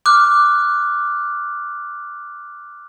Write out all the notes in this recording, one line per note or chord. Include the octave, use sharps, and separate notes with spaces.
D6 F6 F#6